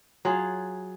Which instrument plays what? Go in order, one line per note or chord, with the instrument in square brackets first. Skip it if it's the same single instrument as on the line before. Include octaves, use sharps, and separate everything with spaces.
[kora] F#3 F4 G#4